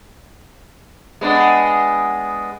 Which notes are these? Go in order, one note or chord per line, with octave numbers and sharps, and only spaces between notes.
G#3 B3 D4